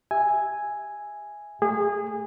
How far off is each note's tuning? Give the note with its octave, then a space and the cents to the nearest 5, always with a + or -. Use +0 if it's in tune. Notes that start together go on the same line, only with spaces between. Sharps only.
G4 +0 E5 +0 G#5 +0
A3 +0 G#4 -25